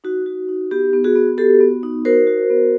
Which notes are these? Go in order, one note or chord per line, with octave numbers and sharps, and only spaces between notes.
D#4 F#4
F#4
D#4
B3 G4
B3
F#4 G#4
B3
F#4 G4 A4
B3
D#4
F#4 A#4 C5
F#4
B3